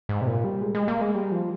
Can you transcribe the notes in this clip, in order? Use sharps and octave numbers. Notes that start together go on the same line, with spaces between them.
G#2
C3
A#2
G3
G#3
G#3
A#3
G#3
G3
F3